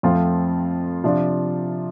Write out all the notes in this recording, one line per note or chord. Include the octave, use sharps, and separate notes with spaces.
F2 F3 A3 C4 F4
C3 F3 D4 F4